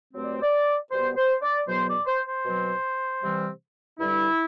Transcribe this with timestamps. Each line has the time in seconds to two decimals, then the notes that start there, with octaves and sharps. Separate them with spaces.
0.14 G2 F#3 A3 C4
0.24 D5
0.34 C5
0.42 D5
0.91 B2 G3 B3 C5
1.17 C5
1.43 D5
1.68 E2 B2 F#3 B3 C5
1.87 D5
2.07 C5
2.26 C5
2.46 B2 F#3 C4
3.23 C3 E3 G3 C4
3.99 G2 D3 G3 E4